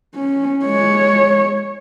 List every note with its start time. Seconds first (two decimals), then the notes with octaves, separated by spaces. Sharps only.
0.15 C#4
0.66 G#3 C#5